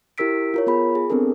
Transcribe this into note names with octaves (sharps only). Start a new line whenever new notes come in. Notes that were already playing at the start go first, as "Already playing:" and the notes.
E4 G4 A#4 E6 B6 D7
F4 A#4 C#5
B3 F4 G#4 B5
G#4
B3 C4 D4 A4 A#4